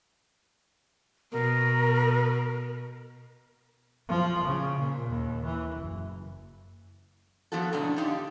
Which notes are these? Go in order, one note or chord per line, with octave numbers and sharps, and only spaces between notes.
B2 A#4
F3
C#3
A#2
D#2
E3
F#1
F3 B3 E4 F#4 A4
G#2 B2 D3 A3 C#4 D4
D3 D#4 F4 G4